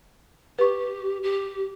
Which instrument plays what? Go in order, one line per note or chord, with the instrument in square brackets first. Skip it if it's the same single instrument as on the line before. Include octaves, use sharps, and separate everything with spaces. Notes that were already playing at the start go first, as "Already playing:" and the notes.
[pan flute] G4 [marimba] B4 C#6
[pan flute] G4